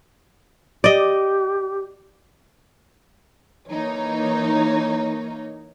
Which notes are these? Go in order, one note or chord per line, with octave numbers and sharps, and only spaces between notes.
G4 D5 D#5
E3 A#3 D#4 C#5